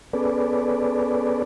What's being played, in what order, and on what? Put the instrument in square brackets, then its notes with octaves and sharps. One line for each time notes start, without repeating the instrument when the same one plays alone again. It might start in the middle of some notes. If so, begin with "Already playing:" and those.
[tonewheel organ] B3 C#4 G#4 A4 B4 D5